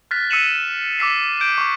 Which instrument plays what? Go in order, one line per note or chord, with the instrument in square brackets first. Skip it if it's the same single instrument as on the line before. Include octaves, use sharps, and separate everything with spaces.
[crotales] F6 F#6 A6 B6
E6 B6 C#7 D#7 E7 F#7
D6 E6 B6 C7
G6 D7
C#6 D6